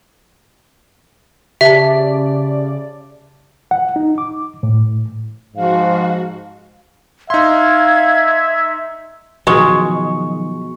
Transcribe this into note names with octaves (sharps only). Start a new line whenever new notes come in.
C#3 G4 D5 E5 A5
F#5
D#4
D6
A2
G#2 F3 F#4 F5
D#4 E5 F5 C6 G#6
B2 D#3 F3 F#3 G#3 G#4 C#6